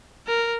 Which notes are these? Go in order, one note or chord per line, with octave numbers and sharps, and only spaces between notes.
A#4